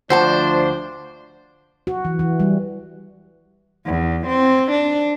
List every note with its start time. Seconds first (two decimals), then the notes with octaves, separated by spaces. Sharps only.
0.10 D2 F3 D4 C5 F#5 A5
1.87 F#4
2.05 E3
2.19 E3
2.40 G3
3.87 E2
4.27 C4
4.71 D4